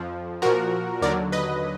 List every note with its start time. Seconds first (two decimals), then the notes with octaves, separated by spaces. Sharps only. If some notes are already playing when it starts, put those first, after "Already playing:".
Already playing: F2 F3
0.42 A#2 F3 F#4 A#4
1.02 D#2 D3 F#3 A#4 D5
1.32 B4 D#5